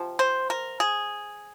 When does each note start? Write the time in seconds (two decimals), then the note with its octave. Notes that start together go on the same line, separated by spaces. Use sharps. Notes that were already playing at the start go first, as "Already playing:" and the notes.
Already playing: C3 F3
0.19 C5
0.50 A#4
0.80 G#4